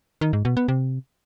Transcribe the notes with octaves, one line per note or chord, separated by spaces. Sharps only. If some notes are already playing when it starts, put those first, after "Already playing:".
D#3
G#2
B2
B3
C3